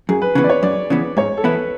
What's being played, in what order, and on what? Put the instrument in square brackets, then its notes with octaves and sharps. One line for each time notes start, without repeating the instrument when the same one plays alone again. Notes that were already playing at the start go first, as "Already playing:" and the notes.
[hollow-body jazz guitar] F#2 [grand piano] G#4
[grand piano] B4
[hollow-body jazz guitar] C#3 E3 B3 [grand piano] B4
[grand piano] D5
C#5
[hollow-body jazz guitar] F#2 [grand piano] D5
[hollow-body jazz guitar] C#3 E3 B3
[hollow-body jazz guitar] G#2 [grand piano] C#5
[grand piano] A4
[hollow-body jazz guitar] E3 B3 E4 [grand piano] B4